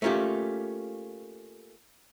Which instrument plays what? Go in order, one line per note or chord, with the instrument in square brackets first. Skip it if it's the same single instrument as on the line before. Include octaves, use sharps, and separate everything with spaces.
[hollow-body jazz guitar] A3 A#3 C#4 F4 G4